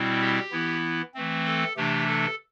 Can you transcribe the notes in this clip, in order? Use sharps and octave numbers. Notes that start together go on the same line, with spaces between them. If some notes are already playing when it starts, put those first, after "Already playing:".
Already playing: B2 G3 C4 E4
G4
E3 B3 E4
E3 A3 C4
A4
C3 E3 A3 D4 G4
A4